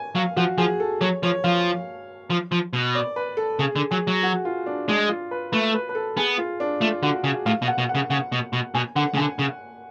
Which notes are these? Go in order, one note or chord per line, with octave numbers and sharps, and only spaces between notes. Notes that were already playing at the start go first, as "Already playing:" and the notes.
Already playing: G#5
F#3 F5
F3 F#4
F3 G#4
A4
F#3 C#5
F3 C#5
F3 F5
F3
F3
B2
D5
B4
A4
C#3 G#4
D3
F#3 G#4
F#3
F#4
F4
D4
G#3 D4
F4
B4
A3 B4
B4
B4
A4
B3 G#4
F4
D4
A3 F4
D3 F#4
C#3 G#4
A2 F5
B2
F#5
B2
F#5
C#3
C#3 F#5
B2
B2
B2 G#5
D3 F#5
C#3
D3 G#5
C#3